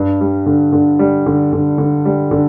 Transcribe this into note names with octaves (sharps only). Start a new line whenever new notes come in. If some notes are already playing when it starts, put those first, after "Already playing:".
Already playing: G2
G3
D3
D3
G3
D3
D3
D3
G3
D3